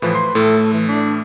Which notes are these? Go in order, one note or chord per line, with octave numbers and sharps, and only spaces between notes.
A2 E3 F3 B4
C6
A2 A3 A4
E3
D4